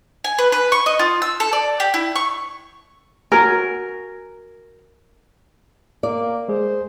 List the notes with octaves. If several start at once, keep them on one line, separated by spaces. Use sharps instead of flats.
G#5
B4
B4
C#6
D#5
F4
E6
A4
D5
G4
E4
C#6
F#4 A#4 G#5
A#3 D5
G#3 G#4 C5